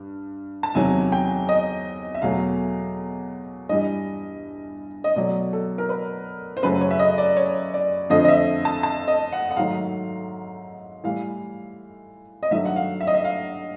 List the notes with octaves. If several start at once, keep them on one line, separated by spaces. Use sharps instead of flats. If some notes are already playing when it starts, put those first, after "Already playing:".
Already playing: G2
A5
E2 C3 D#3 F#3 G#5
G5
D#5
E5
E2 B2 F#3 A3 F5
G2 E3 G3 D#5
D#5
B2 F#3 A3 D5
A4
A#4
B4
C5
F#2 C#3 F#3 A3 B4
C#5
E5
D#5
D5
C#5
D5
F2 D3 F3 A3 D#5
D#5
E5
A5
A5
D#5
F#5
F#5
G#2 D#3 F#3 A3 F5
A2 E3 G3 F5
D#5
G2 D#3 F#3 A3 E5
F#5
F5
E5
D#5
E5
F5